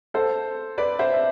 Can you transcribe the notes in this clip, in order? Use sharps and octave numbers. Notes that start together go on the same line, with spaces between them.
A4 C5
B4 D5
C5 E5
E5